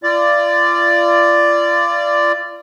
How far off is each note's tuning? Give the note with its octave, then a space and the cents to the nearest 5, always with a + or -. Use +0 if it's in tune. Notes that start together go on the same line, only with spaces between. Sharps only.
F4 -35 D5 +0